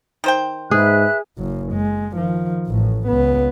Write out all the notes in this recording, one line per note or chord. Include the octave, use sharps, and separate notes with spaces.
D#3 C5 G5
G#2 G#4 B4 E5 F#6
F#1 F#2
G#3
D#3 F3
A1 A2
C#2 B3